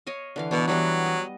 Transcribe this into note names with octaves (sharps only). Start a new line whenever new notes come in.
C#5 D#5 F5
D3 E3 F5
B2 E3 B3 D4
E3 F#3 G3 B3
D#5